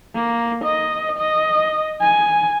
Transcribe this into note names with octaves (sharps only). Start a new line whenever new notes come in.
A#3
D#5
D#5
G#5